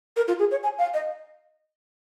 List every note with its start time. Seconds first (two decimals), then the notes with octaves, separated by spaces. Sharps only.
0.16 A#4
0.28 F4
0.39 G#4
0.51 C#5
0.64 G#5
0.78 F5
0.94 D#5